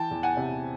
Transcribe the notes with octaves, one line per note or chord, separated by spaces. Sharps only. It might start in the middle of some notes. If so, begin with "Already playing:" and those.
Already playing: E3 G5 A5
E2
F#5 G#5
C3